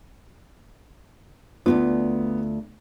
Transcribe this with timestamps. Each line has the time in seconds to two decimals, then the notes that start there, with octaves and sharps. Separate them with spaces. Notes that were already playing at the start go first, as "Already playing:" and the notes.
1.66 D2 G#2 B3 F4